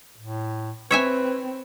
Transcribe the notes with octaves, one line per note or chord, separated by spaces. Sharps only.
A2
C4 B4 C#5 E5 G#5